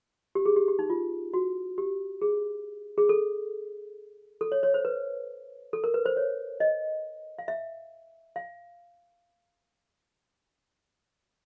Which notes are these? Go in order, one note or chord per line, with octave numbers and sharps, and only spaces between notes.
G4
G#4
G4
G4
D#4
F4
F#4
G4
G#4
G#4
A4
A4
C#5
C#5
C5
B4
A4
A#4
B4
C5
C#5
D#5
F5
E5
F5